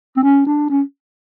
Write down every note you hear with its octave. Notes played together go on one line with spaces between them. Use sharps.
C4
C#4
D4
C#4